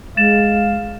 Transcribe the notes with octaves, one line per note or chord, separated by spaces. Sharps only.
G#3 F5 A6 E7